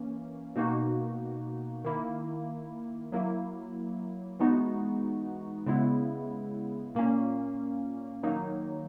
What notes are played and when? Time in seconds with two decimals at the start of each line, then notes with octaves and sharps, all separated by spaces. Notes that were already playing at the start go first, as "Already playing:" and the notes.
Already playing: E3 A#3 C#4
0.56 B2 A#3 D#4 F#4
1.84 D#3 A#3 E4
3.12 F#3 A#3 E4
4.39 E3 G#3 B3 D#4 F#4
5.66 C#3 G#3 B3 E4
6.95 A#2 A#3 C#4
8.23 D#3 F#3 A#3 D#4